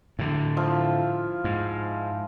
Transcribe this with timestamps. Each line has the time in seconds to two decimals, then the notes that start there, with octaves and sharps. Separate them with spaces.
0.19 A2 D3
0.57 F3 E4 F4
1.44 G#2